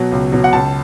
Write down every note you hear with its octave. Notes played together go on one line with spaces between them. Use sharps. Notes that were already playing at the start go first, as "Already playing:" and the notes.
Already playing: B2 F#3
C#2
B2 F#3
F#5
C#2 A5